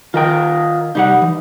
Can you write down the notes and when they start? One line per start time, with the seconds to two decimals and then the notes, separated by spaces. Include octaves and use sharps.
0.14 D#3 F4 A#4 D#5 G5
0.95 C2 G3 D#4 F#5
1.22 E3